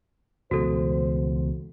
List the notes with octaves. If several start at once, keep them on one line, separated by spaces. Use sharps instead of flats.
C#2 B2 E3 F#4 A4 C5